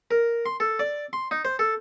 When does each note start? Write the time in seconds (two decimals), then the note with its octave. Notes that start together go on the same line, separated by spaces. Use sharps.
0.11 A#4
0.46 C6
0.60 A4
0.79 D5
1.13 C6
1.31 D#4
1.45 C5
1.59 A4